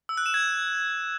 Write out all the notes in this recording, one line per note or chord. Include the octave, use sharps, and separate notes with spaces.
E6
F#6
E7
G#6